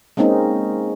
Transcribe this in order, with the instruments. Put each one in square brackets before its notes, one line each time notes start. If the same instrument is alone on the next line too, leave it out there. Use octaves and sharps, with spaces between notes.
[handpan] G#3 A#3 C4 C#4 D#4